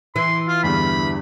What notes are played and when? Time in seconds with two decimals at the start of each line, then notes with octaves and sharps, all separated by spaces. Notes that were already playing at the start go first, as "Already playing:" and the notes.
0.16 E3 C6
0.48 F4
0.63 E2 G2 D3 B5